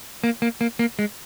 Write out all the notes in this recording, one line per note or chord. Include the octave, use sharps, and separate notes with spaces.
A#3
A#3
A#3
A#3
G#3